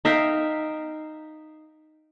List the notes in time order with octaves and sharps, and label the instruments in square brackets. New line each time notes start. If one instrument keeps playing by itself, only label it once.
[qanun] D#4 E5 F5 G5